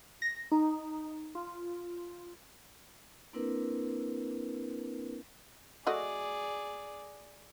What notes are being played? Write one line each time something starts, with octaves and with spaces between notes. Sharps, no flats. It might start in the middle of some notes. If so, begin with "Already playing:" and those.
A#6
D#4
F4
A#3 C4 D4 E4 A#4 B4
A3 F#4 G#4 D5 D#5